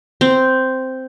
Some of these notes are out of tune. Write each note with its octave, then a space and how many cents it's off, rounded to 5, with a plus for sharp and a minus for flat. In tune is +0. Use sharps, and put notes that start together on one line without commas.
C4 -5